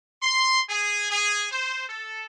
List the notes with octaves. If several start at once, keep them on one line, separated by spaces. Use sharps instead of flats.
C6
G#4
G#4
C5
A4